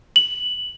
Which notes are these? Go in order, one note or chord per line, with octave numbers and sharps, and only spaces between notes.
F#7